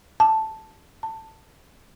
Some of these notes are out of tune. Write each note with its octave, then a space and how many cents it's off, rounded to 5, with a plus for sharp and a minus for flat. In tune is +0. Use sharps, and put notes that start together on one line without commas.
A5 +0
A5 +15